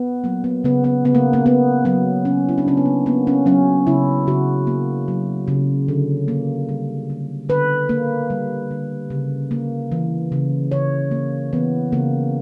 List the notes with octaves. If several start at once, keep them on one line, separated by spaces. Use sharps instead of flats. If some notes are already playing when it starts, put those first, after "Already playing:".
Already playing: B3
F#3 A#3
B3
C#3 B3
B3
C#3 B3
A#3
A#3
A#3 B3
F#3 B3
C#3 C#4
E4
D4
C#3 C#4
B3
A#3
A#3 B3
C#4
F#3 C#4
C#3 E4
C#3 F#4
A#3
F#3
C#3
D3
A#3
G3
D3
D3 B4
A#3
G3
D3
C#3
A#3
E3
C#3
C#3 C#5
A#3
E3 B3
C#3 A#3